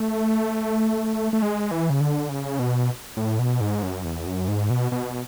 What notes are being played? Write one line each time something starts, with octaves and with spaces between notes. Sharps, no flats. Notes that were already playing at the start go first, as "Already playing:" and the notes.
Already playing: A3
A3
G#3
E3
C#3
D3
C#3
B2
A2
B2
G#2
F#2
E2
F#2
G#2
B2
B2